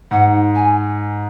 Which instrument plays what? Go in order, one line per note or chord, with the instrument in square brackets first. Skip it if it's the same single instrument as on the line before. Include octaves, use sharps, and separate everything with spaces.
[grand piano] G#2 [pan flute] F#5
[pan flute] G#5